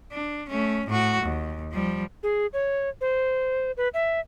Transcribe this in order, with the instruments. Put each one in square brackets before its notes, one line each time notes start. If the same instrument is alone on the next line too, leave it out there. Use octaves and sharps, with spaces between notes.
[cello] D4
A3 C#4
A2 F#4
D#2
F3 G3
[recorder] G#4
C#5
C5
B4
E5